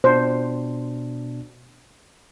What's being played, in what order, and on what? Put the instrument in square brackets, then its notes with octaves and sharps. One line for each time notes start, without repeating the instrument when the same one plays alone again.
[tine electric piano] B2 D4 [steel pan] C5